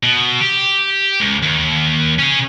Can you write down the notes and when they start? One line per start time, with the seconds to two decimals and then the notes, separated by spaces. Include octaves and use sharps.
0.03 B2
0.41 G4
1.21 C#2
1.43 D#2
2.19 C#4 G#4